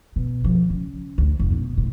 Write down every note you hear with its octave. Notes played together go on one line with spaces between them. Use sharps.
B2
F3
C#3
D2
F1
B2
A2